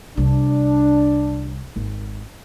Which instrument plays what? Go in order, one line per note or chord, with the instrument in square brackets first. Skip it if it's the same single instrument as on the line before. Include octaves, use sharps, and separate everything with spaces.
[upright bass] C2 [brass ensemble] D4
[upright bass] G#1